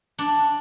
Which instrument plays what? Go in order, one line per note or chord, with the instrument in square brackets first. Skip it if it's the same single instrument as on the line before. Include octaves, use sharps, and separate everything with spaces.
[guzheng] D4